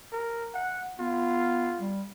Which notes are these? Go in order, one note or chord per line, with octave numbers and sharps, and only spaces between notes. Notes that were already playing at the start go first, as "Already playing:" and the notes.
A#4
F#5
B3 F4
G3